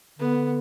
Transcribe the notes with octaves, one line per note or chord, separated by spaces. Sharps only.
D3 B3